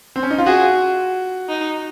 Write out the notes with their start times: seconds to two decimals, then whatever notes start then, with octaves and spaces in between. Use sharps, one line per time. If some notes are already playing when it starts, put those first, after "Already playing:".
0.16 C4
0.23 C#4
0.30 D#4
0.38 F4
0.46 F#4 G#4
1.48 D#4